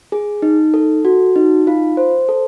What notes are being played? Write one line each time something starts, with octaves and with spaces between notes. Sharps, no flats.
G#4
D#4
A4
F#4
D#4
F4
C5
A4